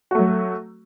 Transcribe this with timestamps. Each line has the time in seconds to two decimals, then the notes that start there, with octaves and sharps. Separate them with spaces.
0.11 F#4
0.15 A3
0.19 F#3